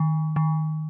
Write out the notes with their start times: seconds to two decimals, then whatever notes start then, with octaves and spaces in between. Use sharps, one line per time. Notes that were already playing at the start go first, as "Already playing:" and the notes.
Already playing: D#3
0.36 D#3